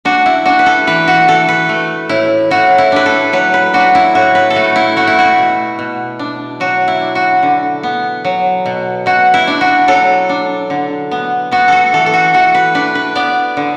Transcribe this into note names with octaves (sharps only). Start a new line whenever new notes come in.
D4 F#4
E4
D4 F#4
B4
A4
E3 B4
F#4
E3 A4
B4
A3
A2 E4
A2 F#4
E4
D4 B4
A4
F#3 B4
B4
D4 F#4
E4
A2 F#4
B4
A4
A3 F#4
E4
A3 F#4
E4
F#4
B2
B2
D4
F#3 F#4
E4
D4
F#4
D3
B3
F#3
B2
B2 F#4
E4
D4
F#4
F#3 A4
D4
D3
B3
B3 F#4
F#4 A4
E3 A4
A4
F#4
E3 F#4
B4
D4 B4
B4
B3 D5
D3